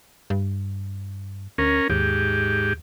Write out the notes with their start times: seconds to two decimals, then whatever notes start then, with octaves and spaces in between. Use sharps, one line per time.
0.30 G2
1.58 D2 C#4 A#4
1.90 D#2 G#2 G4